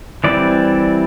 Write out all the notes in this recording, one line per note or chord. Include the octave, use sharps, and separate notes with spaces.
E3 G3 C4 D5